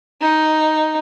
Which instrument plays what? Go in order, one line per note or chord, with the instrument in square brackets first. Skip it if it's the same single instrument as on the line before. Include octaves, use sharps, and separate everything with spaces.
[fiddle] D#4